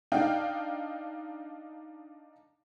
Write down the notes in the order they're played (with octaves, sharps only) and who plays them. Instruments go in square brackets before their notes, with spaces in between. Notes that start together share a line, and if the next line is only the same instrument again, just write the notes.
[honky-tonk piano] D4 D#4 F5 G5